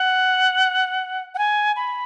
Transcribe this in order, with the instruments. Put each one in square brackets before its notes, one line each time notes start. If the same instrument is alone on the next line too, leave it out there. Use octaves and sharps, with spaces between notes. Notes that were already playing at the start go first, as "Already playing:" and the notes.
Already playing: [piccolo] F#5
F#5
G#5
B5